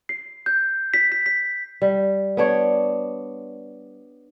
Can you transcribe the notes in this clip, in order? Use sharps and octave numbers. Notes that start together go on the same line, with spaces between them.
C7
G6
B6
B6
B6
G3
B3 D4 C#5